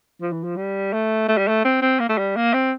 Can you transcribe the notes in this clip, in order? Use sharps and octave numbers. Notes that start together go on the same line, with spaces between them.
F3
E3
F3
G3
A3
A3
G3
A3
C4
C4
A#3
A3
G3
A#3
C4